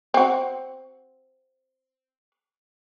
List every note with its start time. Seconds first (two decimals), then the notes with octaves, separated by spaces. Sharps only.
0.14 C4 F#4